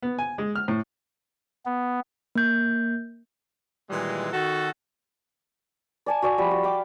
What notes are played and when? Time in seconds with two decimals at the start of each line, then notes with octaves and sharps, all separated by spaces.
0.03 B3
0.19 G#5
0.38 G#3
0.55 F6
0.68 A2
1.66 B3
2.35 A#3 G6
3.90 A#2 D#3 E3 G3 G#3
4.33 D#3 F#4 A4
6.06 D5 G#5 A5
6.22 F#4 D5 G#5
6.38 F3 G3 B5
6.51 F#4
6.64 F5 G5 D6